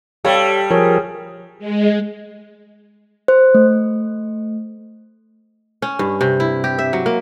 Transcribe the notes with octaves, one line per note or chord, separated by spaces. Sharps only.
G3 G4 A4 C#5 F5
F3 G#4 A#4 C#5
G#3
C5
A3
C#4
G2
C3
E4
G4
E5
F#3
A#3